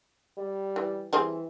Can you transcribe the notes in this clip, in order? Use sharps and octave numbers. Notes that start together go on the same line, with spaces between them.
G3
E3
E3 G3 C4 G#4